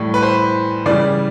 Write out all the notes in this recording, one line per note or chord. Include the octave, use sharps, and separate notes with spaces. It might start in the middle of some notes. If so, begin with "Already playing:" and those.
Already playing: A2 E3 G3
B4
C5
C#3 E3 G3 D5